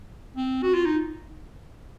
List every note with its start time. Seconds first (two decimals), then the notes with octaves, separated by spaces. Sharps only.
0.36 C4
0.63 F#4
0.74 F4
0.85 D#4